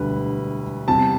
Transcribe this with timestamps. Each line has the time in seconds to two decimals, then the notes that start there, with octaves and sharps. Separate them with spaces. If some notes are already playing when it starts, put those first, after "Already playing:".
Already playing: E1 D2 D3 G3 B4
0.87 E2 C3 G3 A5